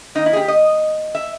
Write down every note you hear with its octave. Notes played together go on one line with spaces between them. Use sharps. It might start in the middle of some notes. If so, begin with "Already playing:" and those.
D#3 A#3 D#4
E4
G#4
G4
D#5
E5